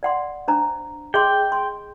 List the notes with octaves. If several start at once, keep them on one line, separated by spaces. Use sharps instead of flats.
D5 F#5 C6
D4 C5 A#5
G#4 D#5 G5 C6
C6